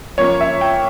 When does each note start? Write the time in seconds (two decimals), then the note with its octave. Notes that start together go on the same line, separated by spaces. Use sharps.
0.18 F3 A#3 C#4 C#5
0.41 E5
0.61 G5